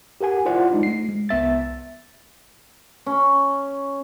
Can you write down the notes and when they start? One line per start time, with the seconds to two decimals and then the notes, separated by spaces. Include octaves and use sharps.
0.21 G4 A#4 F#5 G#5
0.45 E4 F4 C5 D5 F#5
0.71 G#3 D4 D#4 F4
0.83 A3 C7
1.09 G#3
1.29 C2 B3 E5 A6
3.06 C#4